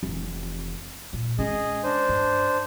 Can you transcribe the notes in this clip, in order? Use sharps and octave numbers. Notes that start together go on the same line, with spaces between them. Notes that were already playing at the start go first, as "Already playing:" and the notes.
F1 E3
A#2
G#3 C#4 G#4 D#5
D4 C5
G2